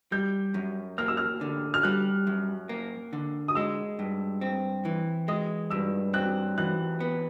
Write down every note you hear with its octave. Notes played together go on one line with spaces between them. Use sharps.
G3 G6
F#2
A#3 F6
E6
F6
D3
F6
G3 F#6
F#2
A#3
D3
D#6
G#3 E6
G2
C4
E3
G#3 D#6
G2 E6
C4 F#6
E3 F#6
B3